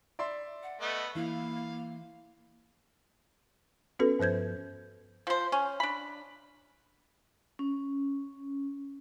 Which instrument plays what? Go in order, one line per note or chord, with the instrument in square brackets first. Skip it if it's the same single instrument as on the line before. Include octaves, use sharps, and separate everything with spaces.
[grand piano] D5 E5 C6
[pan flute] F#5
[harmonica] A3 B3 [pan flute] D#5
[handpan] E3 E4 [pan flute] A#3 [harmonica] F5
[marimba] B3 C#4 F#4 A4 B4
G2 F3 C5 G6 G#6
[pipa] F3 C5
C#4
D4 B5
[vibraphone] C#4